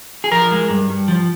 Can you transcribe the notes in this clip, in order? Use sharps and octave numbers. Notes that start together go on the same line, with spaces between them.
G#4
F3 A#4
G#3
G2
G2
F3